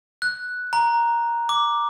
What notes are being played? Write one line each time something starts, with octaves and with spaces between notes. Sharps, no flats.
F#6
A#5
D6